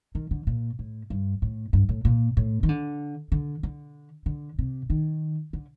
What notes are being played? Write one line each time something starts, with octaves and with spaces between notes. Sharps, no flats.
D#3
D3
A#2
A2
G2
A2
G2
A2
A#2
A2
D#3
D3
D3
D3
D3
C3
D#3
D3